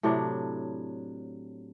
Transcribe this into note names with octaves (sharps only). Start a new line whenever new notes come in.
A2 C3 F#3 D4